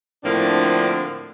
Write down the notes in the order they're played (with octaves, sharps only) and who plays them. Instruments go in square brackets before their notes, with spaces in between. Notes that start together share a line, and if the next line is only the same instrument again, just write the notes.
[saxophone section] A2 D3 F3 A#3 C4 D4